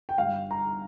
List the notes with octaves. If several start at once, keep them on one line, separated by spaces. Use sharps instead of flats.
G5
G1 G2 G3 F5
A#5